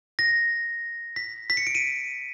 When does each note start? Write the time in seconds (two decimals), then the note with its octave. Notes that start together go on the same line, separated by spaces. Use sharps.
0.19 A#6
1.16 B6
1.50 B6
1.57 C#7
1.67 D7
1.75 D#7